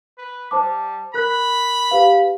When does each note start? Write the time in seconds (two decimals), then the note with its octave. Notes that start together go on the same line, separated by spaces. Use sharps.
0.18 B4
0.51 G3 C5 A5 D6
1.14 A#4 B5 F#6
1.91 G4 B4 F5